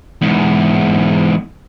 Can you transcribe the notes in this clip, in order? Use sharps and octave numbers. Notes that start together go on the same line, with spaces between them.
E2 G#2